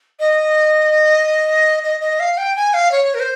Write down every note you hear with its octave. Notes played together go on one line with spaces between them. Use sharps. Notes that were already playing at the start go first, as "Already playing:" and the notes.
D#5
D#5
D#5
F5
G5
G#5
F5
C#5
A#4
C5